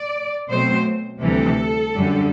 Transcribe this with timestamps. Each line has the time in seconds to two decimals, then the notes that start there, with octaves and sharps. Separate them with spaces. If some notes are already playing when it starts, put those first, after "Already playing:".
Already playing: D5
0.49 B2 F#3 A3 C4 C5
1.22 D2 C3 E3 G3 A4
1.95 F#2 D3 G3